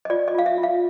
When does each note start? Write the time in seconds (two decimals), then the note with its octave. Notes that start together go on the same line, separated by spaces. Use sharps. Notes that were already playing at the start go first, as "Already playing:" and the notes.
0.05 D#5
0.10 F4 D5
0.28 D#5
0.35 F4 F5
0.46 E5
0.58 F4
0.63 F5